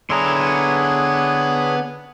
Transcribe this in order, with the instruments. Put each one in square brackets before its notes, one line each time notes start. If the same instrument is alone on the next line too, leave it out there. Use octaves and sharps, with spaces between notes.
[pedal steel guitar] D3 E4 A#5 [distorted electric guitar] B3 C6 [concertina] D4 G#4 C#5